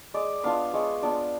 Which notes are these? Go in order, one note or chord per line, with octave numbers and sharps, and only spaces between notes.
G#3 D5
B3 D4 F4 F5
G#3 C#5
B3 D4 F4 D5